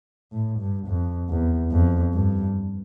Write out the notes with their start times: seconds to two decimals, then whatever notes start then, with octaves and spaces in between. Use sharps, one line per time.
0.32 A2
0.59 G2
0.87 F2
1.29 E2
1.71 F2
2.13 G2